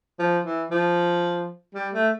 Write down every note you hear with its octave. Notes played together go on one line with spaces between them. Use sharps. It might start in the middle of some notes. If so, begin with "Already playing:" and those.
F3
E3
F3
G3
A3